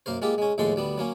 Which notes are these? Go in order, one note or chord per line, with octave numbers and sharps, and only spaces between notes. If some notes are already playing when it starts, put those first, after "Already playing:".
F#2 A#3 A#4 C5
G#3 A#3 F4 G4 E5
G#3 C#4
D#2 A2 F3 G#3 A4 C6
D2 G3 B3
F#3 A#3 C#4